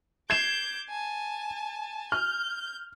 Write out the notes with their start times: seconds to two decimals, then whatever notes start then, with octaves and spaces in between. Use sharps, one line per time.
0.30 D6 G6 G#6 C7 E7
0.89 G#5 A5
2.12 F6 G6